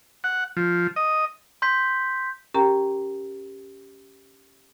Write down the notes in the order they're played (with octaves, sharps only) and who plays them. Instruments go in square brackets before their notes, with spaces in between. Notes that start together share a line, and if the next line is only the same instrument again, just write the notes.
[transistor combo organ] F#5
F3
D#5
[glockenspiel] C6 G6 B6
[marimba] C#4 G4 A#4 G5 A#5